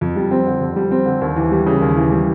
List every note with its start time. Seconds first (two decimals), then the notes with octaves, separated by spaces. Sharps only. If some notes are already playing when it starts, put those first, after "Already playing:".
0.01 F2
0.16 G3
0.31 C4
0.46 D3
0.61 F2
0.76 G3
0.91 C4
1.06 D3
1.21 D#2
1.36 E3
1.52 G3
1.66 C#3
1.81 D#2
1.97 E3
2.12 G3